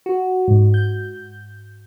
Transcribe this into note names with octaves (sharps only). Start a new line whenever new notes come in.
F#4
G#2
G6